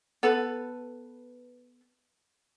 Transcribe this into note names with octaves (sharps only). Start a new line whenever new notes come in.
B3 A4 B4